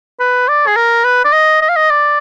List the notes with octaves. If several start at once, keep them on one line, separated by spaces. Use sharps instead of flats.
B4
D5
G#4
A#4
B4
D5
D#5
D#5
F5
D#5
D5